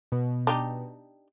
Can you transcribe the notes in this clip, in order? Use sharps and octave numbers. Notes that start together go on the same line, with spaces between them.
B2
D4 D#4 G4